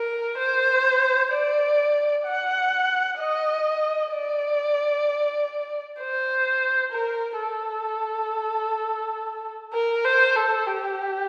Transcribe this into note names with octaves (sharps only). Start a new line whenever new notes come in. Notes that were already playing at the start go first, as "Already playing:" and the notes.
Already playing: A#4
C5
D5
F#5
D#5
D5
C5
A#4
A4
A#4
C5
A4
G4